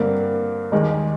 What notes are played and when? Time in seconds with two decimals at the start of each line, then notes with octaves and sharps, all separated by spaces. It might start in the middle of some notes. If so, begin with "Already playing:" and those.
Already playing: G2 D3 G3 A#3 C4
0.72 D#2 D#3 G3 G#3